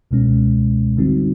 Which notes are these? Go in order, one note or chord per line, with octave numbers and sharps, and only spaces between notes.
C#2 B2 G#3 C#4
D3 G3 C4 D#4 F#4